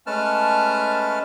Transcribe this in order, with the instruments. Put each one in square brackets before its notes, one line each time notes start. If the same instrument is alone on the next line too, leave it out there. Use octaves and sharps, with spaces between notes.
[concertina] G#3 A3 C#4 B4 A5 F6